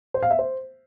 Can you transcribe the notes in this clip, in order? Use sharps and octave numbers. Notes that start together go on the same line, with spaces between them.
C5
F5
E5
C5